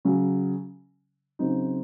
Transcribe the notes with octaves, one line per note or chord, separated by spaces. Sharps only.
C#3 F#3 C#4
C#3 F#3 C4 D#4